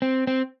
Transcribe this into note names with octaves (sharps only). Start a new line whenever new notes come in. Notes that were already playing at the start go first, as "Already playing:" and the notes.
C4
C4